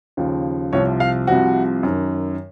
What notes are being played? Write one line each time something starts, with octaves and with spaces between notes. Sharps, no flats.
D#2 C#3 F3
C2 C3 F3 C#5
F5
C2 C3 F3 F#4
F#2 D#3